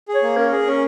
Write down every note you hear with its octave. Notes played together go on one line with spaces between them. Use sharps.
G#4
C#5
A#3
C#4 A#4
G#4
C#4